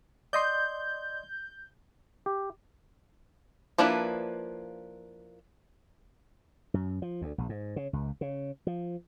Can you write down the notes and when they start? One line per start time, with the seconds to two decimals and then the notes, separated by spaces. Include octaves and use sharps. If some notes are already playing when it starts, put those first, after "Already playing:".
0.33 D5 D#5 C6 G6
2.26 G4
3.78 F3 A#3 D4 E4 B4
6.74 F#2
7.02 F3
7.22 D2
7.38 A#1
7.49 G#2
7.76 C#3
7.93 C#2
8.21 C#3
8.67 F3